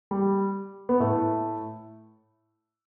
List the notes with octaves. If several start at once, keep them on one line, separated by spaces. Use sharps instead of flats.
G3
B3
A2 A3